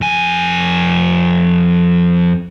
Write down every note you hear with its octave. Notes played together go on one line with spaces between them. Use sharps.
F2 G#5